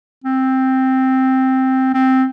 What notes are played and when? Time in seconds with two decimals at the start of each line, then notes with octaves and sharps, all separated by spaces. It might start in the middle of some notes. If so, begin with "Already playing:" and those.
0.24 C4
1.94 C4